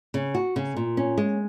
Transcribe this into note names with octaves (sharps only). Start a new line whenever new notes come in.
C#3
F#4
C#3
A#2
C#4
G#3